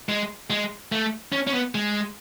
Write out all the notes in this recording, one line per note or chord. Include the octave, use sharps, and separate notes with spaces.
G#3
G#3
A3
C#4
C#4
B3
G#3